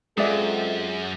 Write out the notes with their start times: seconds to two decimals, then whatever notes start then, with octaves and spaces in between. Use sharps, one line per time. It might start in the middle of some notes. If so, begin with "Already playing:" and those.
0.17 F#2 G#3 C4 F4 G#4 A4 D5 E5